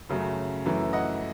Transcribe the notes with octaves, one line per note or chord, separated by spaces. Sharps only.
F#2 C#3 F#3 A3
F#2 E3 A3
D#5 F#5